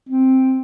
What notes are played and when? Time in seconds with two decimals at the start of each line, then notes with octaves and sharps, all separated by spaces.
0.09 C4